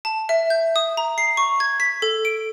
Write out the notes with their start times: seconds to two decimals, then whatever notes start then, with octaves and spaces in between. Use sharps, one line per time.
0.05 A5
0.29 E5
0.50 G6
0.76 D#6
0.97 A#5
1.18 C7
1.37 C#6
1.60 G#6
1.80 B6
2.02 A4
2.25 D7